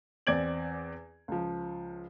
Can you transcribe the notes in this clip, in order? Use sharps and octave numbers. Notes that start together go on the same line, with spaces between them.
E2 C4 D5 G#6 D7 F#7
C#2 F3